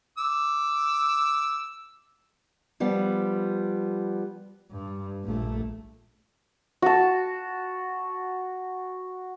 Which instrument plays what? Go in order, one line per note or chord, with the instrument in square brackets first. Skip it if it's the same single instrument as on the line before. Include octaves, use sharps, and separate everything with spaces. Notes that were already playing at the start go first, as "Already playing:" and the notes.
[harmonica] D6 E6
[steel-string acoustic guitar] F3 G3 B3
[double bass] G2
A#1 A3
[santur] F#4 A5